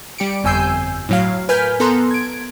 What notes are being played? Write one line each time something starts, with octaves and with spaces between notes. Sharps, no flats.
G3 G4 C#7 D7
G1 F2 G#5 E6 G6 C7
A2 F#3 F5
A#4 B4 G#5 F6 G6 B6
B3 A4 A#5 C6 F#6
G#6 D7